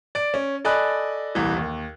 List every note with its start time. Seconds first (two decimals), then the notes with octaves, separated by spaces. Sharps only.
0.15 D5 D7
0.34 C#4
0.65 A4 D5 D#5 G#5 B5 F#6
1.35 D#1 C2 E3
1.57 D#2